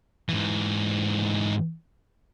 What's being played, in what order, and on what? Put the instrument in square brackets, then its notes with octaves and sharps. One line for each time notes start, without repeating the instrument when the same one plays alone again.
[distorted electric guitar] G#2 E3